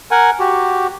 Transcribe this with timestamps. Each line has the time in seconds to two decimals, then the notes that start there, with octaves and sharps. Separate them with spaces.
0.11 A#4 F#5 G#5
0.40 F#4 G4